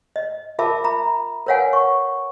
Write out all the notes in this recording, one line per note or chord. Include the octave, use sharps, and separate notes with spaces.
D#5
F4 A#4 E5 A5 B5 D6
E5 A#5 B5
A#4 B4 C#5 F5 F#5 G#5
C#6